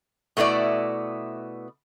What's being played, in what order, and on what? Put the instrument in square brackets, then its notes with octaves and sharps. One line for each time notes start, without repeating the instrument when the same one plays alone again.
[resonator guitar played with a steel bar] B2 A3 B3 E4 D5